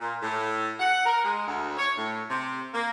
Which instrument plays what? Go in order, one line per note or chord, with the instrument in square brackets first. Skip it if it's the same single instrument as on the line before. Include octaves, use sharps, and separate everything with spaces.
[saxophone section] A#2
A2
F#5
A#4
G#3
D2
C#5
A2
C3
A#3